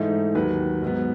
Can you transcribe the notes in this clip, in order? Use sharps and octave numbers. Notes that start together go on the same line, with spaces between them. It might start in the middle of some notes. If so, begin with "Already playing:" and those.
Already playing: G#2 E3 A3 D#4
D#2 D#3 F#3 B4
G#2 F#3 B3